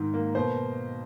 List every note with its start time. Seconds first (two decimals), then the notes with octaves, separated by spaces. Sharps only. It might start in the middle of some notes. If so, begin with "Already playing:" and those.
Already playing: G#2 D#3
0.14 A#3
0.35 B2 C5